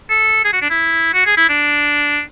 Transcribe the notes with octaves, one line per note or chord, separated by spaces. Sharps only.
A4
G#4
F#4
D4
E4
F#4
G#4
E4
D4